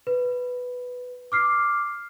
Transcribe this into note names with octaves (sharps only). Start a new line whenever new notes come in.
B4
D6 F6 C7